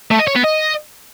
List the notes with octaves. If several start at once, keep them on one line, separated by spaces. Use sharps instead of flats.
A3
D#5
C#5
B3
D#5